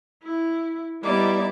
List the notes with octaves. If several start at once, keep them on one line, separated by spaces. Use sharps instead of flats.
E4
G3 B3 D#4 E4 D5 D6